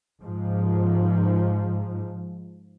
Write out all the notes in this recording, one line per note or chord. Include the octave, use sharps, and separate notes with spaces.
G#2 F3